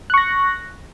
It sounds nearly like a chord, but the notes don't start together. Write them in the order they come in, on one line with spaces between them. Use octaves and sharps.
F#6 C#6 A#6